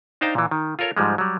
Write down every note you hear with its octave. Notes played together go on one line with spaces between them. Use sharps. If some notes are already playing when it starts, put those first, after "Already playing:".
D4 D#4 C5 F5 G5 A#5
A#2 E3
D#3
F4 A4 A#4 C#5
G#2 F3 G3 G#3
F#3 G3